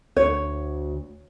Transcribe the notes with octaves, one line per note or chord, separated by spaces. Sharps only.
D2 C#5